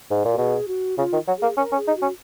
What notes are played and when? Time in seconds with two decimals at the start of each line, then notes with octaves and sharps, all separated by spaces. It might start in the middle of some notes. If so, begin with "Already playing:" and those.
0.10 G#2
0.25 A#2
0.33 F#4
0.38 B2 G#4
0.68 F#4
0.98 C#3 F4
1.13 D#3
1.27 F#3
1.38 A#3 G#4
1.57 C#4 A#4
1.72 C#4
1.77 G#4
1.87 D#4
1.97 F#4
2.02 C#4